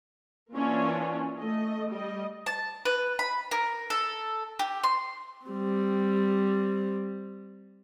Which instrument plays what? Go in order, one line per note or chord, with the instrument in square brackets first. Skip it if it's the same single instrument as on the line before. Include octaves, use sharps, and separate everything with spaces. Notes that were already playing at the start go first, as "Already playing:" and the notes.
[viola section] E3 A#3 C#4 D4 F4
A3 D#5
G3 D#5
[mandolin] A5
B4
B5
A#4
A4
G4
C6
[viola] G3 C4